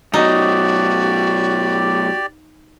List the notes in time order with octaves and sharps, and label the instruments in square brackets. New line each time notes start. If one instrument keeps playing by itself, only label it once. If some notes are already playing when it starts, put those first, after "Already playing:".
[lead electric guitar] F#2 B2 [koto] D#4 [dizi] F#4 [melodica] G4 D5